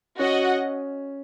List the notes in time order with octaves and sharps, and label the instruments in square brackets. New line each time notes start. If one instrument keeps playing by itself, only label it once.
[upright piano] C#4 [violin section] F#4 D#5 F#5